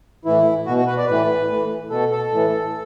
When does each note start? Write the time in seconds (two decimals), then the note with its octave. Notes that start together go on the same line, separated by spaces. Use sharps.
0.25 A2 E3 E4
0.66 B2 F#4
0.77 F#4
0.87 B4
0.98 D5
1.07 A2 E3 B4
1.49 A2 E3
1.89 B2 A4
2.11 A4
2.31 A2 E3